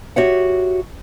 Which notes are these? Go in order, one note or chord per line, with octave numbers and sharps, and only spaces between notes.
F#4 G4 C#5 E5 F#5